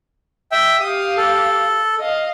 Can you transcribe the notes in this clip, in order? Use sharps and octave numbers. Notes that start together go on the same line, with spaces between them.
E5 G5
G4 F5 D#6
A4
D#5 F5